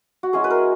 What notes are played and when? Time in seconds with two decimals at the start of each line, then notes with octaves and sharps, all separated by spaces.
0.23 F#4
0.33 G#3 C#4 E4 G#4
0.44 B4
0.51 A#4